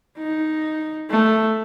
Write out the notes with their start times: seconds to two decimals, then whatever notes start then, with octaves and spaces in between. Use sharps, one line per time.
0.18 D#4
1.10 A3